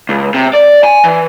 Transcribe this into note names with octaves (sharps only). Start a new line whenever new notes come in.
C#2
C3
D5
G#5
E3